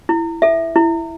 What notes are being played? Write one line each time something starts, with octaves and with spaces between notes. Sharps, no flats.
E4
A4 E5
E4